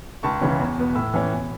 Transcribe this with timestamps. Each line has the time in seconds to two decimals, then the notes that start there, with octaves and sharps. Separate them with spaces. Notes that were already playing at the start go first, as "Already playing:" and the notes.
0.23 C#2 A5 C#6
0.41 C#3 E3 C#4
0.59 E2
0.78 B2 B3
0.95 A2 B5 E6
1.14 E3 C#4
1.31 B2